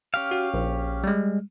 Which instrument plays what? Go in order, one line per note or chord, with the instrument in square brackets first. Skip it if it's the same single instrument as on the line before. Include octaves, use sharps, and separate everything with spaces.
[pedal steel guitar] C#4 G4 F5
[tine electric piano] F#4
A#1
G3 G#3